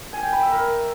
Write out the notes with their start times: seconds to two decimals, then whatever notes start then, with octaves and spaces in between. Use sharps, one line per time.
0.13 G#5
0.23 G5
0.33 B5
0.42 E5
0.52 A#4